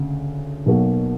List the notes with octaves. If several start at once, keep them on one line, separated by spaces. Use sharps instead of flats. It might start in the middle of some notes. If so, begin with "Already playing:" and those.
Already playing: D2 C#3
B1 B2 F#3 A#3